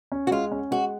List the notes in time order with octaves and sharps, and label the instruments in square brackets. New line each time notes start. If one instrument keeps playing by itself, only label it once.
[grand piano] C#4
[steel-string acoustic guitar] F#4
[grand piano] G#3 [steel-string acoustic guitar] F4
[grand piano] C#4
[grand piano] G#3 [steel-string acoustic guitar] F#4